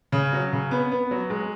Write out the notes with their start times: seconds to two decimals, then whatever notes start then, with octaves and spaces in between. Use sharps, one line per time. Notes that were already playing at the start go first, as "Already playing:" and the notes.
0.12 C#3
0.33 F#3
0.53 C#3
0.71 B3
0.92 B3
1.11 F#3
1.30 G#3